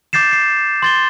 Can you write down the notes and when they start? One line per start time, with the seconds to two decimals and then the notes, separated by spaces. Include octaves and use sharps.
0.13 D6 G6 A6 C7 E7
0.33 C7
0.82 C6 A6 G7